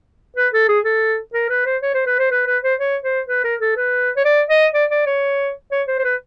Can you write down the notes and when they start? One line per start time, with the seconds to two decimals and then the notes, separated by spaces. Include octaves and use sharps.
0.36 B4
0.53 A4
0.68 G#4
0.84 A4
1.34 A#4
1.49 B4
1.66 C5
1.82 C#5
1.94 C5
2.06 B4
2.19 C5
2.31 B4
2.47 B4
2.63 C5
2.79 C#5
3.04 C5
3.28 B4
3.44 A#4
3.61 A4
3.77 B4
4.16 C#5
4.25 D5
4.50 D#5
4.74 D5
4.90 D5
5.06 C#5
5.71 C#5
5.88 C5
5.99 C5
6.04 B4